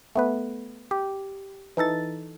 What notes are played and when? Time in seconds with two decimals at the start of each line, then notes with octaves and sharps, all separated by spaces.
0.15 A3 B3 B4
0.91 G4
1.77 E3 D#4 A4 A6